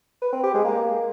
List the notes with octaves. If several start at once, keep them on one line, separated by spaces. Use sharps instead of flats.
B4
C4
G4
G#3
A#3